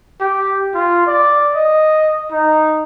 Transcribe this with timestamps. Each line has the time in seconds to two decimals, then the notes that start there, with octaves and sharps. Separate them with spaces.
0.21 G4
0.74 F4
1.07 D5
1.55 D#5
2.31 D#4